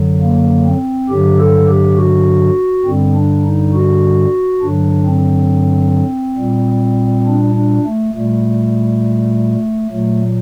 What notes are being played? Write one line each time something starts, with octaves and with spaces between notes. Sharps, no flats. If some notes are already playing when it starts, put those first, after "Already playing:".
Already playing: F#2 D3 F#3
A#3
C4
G2 D3 F#3 G4
A4
G4
F#4
G2 D3 G3 C4
D4
D#4
F#4
G2 D3 F#3 D4
C4
A#2 G3
D4
D4
A3
A#2 G3 A3
A#2 F#3 A3